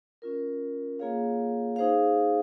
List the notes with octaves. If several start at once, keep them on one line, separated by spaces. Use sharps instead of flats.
C#4 F4 A#4
A#3 F4 G#4 C#5 F5
D#4 G#4 C5 F5